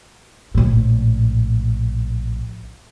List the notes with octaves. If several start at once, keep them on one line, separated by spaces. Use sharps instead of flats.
A#1 A2